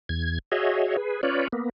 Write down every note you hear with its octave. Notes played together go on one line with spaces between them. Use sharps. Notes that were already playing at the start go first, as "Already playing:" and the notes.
E2 G#6
F#4 G#4 C#5 D#5 E5
G#4 B4
C#4 F4 B4 C#5 D5
A#3 B3